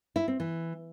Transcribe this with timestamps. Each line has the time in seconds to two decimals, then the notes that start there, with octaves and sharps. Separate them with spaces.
0.16 E4
0.28 C4
0.40 E3